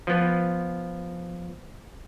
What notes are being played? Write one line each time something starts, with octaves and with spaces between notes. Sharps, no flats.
F3 B3